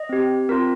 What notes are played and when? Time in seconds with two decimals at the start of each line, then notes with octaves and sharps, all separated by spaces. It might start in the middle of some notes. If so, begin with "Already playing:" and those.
Already playing: D#5
0.09 C4 G4
0.49 C4 F4 A#4